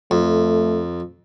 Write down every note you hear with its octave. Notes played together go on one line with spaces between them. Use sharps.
F2 A3